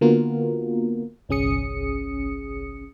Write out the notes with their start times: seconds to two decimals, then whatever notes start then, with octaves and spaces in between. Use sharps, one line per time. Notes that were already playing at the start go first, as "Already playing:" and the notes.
0.01 D3 A#3 B3 F4 F#4 A#4
1.29 G1 C2 C#4 G#4 D#6 C#7